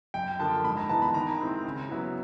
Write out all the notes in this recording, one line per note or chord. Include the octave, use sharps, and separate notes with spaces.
F#2 G5
D3 F3 A#3 A5
G#2 B5
A#5
E3 G#3 B3 A5
B5
D#3 A#5
G#3 C4 E4
C#3
F#3 B3 E4